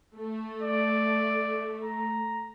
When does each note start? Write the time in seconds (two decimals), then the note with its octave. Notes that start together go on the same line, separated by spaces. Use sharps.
0.16 A3
0.62 D5
1.84 A#5